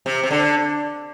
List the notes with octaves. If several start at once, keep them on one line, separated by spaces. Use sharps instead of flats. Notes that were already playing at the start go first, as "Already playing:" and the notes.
C3
C3
D3